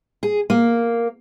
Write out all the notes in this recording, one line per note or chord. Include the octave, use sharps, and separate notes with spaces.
G#4
A#3